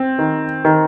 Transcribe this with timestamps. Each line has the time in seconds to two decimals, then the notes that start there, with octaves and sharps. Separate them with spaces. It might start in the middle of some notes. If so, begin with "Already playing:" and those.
Already playing: C4
0.19 D#3
0.65 D#3